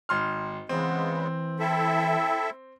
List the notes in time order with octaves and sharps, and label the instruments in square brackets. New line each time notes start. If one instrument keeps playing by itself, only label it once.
[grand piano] G#1 C6 F6
[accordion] C#3 G#3 B3 [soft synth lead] E3 [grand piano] C4
[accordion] E4 A4 E5 [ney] G5